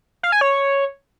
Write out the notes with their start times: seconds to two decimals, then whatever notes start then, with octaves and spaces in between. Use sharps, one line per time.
0.23 F5
0.32 G#5
0.41 C#5